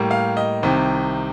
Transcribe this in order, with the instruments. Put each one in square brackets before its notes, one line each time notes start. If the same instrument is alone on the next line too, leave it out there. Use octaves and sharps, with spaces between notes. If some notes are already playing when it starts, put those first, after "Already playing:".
Already playing: [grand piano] A2 G3 A#3
F5
D#5
C2 C3 D#3